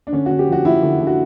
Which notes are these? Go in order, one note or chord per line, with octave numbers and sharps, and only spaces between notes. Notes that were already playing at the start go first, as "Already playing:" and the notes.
D4
D3 C#4
F#4
D3
G4
F3 F#4
F3 E4
D3
D3
F#4